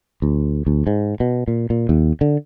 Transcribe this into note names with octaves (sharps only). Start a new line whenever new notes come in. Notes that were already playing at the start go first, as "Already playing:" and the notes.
D2
D2
G#2
B2
A#2
A#2
D#2
D3